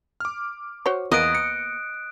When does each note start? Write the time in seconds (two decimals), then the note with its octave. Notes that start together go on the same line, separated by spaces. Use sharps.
0.20 D6 F6
0.86 F#4 C5 C#5
1.12 E2 A#3 B3 D#5 D#6 F#6 D7
1.35 C#7